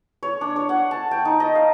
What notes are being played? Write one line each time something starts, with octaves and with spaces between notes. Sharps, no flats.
C#5
D4
C#5
F#5
A5
G5
D#4
D#5
F5